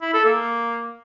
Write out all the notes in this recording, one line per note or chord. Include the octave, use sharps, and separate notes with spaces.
E4
A4
A#3